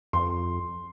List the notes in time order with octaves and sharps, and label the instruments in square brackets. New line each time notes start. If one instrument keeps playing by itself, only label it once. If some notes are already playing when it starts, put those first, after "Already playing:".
[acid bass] F2 [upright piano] C6